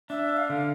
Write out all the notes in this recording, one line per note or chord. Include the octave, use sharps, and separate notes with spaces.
D4 E5
F5
D3